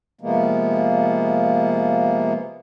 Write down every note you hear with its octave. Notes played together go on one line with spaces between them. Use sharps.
C3 F3 G#3 A#3 B3